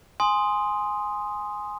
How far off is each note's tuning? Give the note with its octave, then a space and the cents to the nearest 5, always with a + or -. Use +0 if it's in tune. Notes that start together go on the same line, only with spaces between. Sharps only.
G#5 +0 C6 +0 D#6 +0